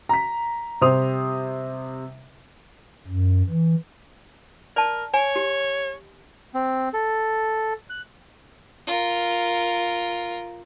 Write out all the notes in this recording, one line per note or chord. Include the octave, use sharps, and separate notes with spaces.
A#5 B6
C3 G3 C5 D#6 F7
F#2
E3
A#4 D5 A5
C#5 G#5
G4
C4
A4
F#6
F4 A#4